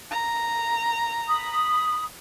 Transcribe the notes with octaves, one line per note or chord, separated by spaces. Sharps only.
A#5
B5 D#6